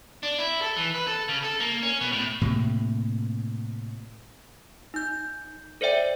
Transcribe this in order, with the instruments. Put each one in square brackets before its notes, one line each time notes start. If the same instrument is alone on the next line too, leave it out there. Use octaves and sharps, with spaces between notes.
[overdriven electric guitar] D4
E4
A4
E3
B4
A4
C#3
A4
A#3
C#4
B2
A2
[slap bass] A2 C3 A#3
[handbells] D#4 G6
A4 C5 D5 E5 G5